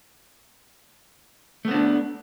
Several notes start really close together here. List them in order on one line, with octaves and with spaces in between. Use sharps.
A3 B3 C4 D4